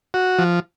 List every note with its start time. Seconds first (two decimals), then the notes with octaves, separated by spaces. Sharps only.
0.14 F#4
0.39 F3